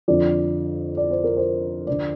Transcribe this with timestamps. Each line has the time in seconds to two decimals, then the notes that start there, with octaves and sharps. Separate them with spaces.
0.08 F2 D3 F3 D5
0.97 D5
1.11 C5
1.24 A#4
1.37 C5
1.87 D2 D3 F3 D5